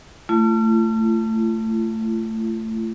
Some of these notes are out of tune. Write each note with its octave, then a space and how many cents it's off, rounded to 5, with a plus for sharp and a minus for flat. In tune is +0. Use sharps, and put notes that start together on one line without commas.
A3 +15 F4 -45